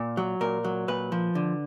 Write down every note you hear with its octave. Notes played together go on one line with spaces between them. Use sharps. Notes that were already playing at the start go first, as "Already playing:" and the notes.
Already playing: A#2
F#3
A#2 A#4
F#3
A#2 B4
F3
D3